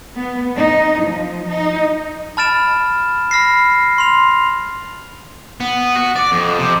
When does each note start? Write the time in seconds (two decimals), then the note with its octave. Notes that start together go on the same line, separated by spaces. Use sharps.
0.16 B3
0.57 D#4
1.02 F3
1.50 D#4
2.37 A5 B5 F6 A6 D7 E7
3.31 B5 F6 A#6 C7
3.98 C6 F7
5.60 B3
5.96 F#4
6.16 D5
6.32 F2
6.59 C3